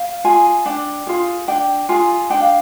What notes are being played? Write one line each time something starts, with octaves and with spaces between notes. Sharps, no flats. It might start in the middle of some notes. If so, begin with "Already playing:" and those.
Already playing: F5
F4 G#4 G#5
D4 G5
F4 G#4
D4 G5
F4 G#4 G#5
D4 G5
F5